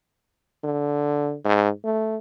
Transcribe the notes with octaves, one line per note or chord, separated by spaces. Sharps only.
D3
G#2
A3